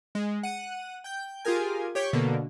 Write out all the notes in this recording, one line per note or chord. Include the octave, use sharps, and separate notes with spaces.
G#3
F#5 D#7
G5 G6
F4 G4 G#4 A#4 G#5
G4 C#5 D6 G6 B6
B2 D3 A#3